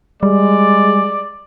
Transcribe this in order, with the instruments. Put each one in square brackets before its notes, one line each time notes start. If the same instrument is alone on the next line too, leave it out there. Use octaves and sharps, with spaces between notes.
[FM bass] G3 [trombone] G#3 [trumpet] D5